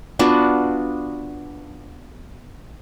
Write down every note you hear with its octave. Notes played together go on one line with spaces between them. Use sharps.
B3 D4 F4 F#4